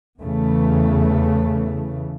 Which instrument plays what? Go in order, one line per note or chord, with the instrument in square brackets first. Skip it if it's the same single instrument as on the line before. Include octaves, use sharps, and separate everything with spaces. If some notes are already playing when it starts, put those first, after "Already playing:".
[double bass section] E2 C#3 E3 A3